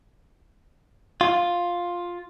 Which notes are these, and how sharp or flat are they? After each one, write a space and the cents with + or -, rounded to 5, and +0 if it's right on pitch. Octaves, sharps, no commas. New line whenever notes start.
F4 +5